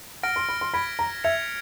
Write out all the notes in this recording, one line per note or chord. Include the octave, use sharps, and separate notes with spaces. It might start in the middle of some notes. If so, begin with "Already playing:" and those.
F#5 F6 A#6 D7
C6
B5
C6
B5 G#6 B6 D7
A#5
E5 G#6 C#7 F7